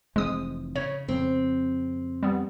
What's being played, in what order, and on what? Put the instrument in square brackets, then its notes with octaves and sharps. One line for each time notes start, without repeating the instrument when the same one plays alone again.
[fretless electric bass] F1 E3 C4 [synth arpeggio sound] G#3 D#6
[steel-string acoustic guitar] C#3 [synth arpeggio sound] C#5
[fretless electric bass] F2 C#3 [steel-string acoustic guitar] C4
[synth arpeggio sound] G3 B3